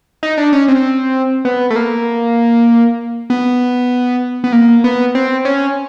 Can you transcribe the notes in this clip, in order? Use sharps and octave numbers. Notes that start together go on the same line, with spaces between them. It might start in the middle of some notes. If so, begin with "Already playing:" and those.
D#4
D4
C#4
C4
B3
A3
A#3
B3
B3
A#3
B3
C4
C#4